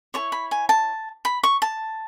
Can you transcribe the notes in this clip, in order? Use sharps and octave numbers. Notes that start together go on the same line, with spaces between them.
E4 A4 C#5 C#6
B5
G#5
A5
B5
C#6
A5